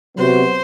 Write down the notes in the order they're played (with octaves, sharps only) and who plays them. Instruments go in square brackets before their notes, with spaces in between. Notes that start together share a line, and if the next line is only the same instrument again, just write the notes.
[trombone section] C3 F#3 B3 F#4 [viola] C5